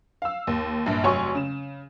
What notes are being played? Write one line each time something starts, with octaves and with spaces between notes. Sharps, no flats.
F5 E6
D#2
A#1 G2
F1 F#3 C#5 G#5 C6 C#6
C#3 E7